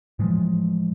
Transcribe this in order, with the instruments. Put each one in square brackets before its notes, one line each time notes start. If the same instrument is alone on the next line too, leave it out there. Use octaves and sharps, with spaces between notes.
[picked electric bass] A2 E3 F3 G#3